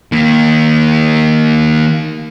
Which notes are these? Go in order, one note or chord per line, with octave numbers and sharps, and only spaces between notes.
D#3 A#3